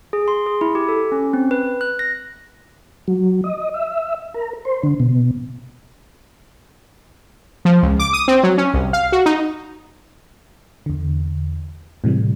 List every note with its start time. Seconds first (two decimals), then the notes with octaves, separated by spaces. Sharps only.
0.13 G#4
0.28 C6
0.46 G#4
0.61 E4
0.75 G4
0.89 A4
1.12 C#4
1.33 C4
1.51 B4
1.81 F#6
1.99 A#6
3.08 F#3
3.44 D#5
3.74 E5
4.34 A#4
4.65 C5
4.83 D3
5.00 B2
7.65 F3
7.83 C#2
7.99 D6
8.13 D#6
8.28 C4
8.43 F#3
8.58 C#4
8.74 C2
8.93 F5
9.12 F#4
9.26 D#4
10.86 E2 D3
12.04 A2 C3 E3 G3